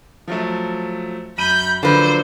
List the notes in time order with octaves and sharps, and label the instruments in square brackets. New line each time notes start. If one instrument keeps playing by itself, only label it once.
[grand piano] F3 F#3 A3
[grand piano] F#2 D#7 [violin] B5 G6
[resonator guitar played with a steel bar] D3 B4 [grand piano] F3 F#3 A#3 [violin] C5